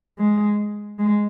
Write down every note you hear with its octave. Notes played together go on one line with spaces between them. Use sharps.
G#3
G#3